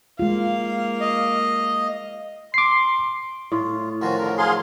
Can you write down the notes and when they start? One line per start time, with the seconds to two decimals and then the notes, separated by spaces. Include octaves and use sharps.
0.19 G#3 A#3 F4 F5
1.00 D#5
2.54 C6 D6 C7
3.52 A2 F4
4.02 D#3 F3 C#4 F4 F#4
4.19 D3 A#4 A#5
4.38 F#3 G#4 F5 C6